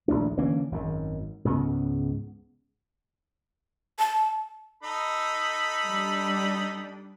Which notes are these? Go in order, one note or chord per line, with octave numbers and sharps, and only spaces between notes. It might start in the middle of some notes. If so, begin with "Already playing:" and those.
A#1 D#2 A3 D4
D3 E3 A#3 C#4
G#1 F#2 D#3
C#2 G#2 C#3 B3
A5
D#4 A4 B5
G3 D4